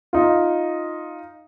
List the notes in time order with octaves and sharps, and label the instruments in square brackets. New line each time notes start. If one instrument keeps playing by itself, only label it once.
[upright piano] D#4 F4